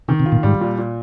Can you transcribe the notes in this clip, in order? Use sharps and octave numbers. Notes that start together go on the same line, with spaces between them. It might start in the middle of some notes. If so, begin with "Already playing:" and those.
C3 D#3
C3
F4
A#2
G#2 G3
A#2
A#2